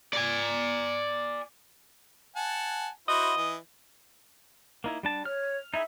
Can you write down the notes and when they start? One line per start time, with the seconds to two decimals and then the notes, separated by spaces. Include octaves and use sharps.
0.13 D5 G#5
2.36 F#5 G#5 A5
3.08 E4 F#4 C5 D#5
3.37 E3
4.84 A#3 D#4 E4
5.03 G3 D4 A5
5.25 C#5 F6
5.74 D#4 E4 G#4 E5